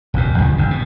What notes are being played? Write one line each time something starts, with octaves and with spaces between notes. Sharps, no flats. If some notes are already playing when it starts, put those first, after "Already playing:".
F1 D#2 A#2
D2 G2 C#3 F3
G1 F#2 D3
B2